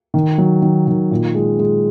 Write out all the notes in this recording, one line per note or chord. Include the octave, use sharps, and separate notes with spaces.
D#3
F#3
D#3
D#3
A#2
G#3
G#3